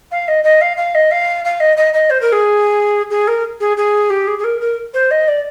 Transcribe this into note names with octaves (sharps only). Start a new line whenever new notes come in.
F5
D#5
D#5
F5
F5
D#5
F5
F5
D#5
D#5
D#5
C5
A#4
G#4
G#4
A#4
G#4
G#4
G4
G#4
G#4
A#4
A#4
C5
D#5
D5